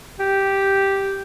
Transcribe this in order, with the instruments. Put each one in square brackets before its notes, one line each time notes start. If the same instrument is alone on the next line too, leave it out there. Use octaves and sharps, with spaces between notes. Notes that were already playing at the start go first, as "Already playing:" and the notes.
[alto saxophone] G4